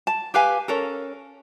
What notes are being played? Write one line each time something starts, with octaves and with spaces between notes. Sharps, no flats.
A5
G4 B4 F5 G#5
C#4 A4 A#4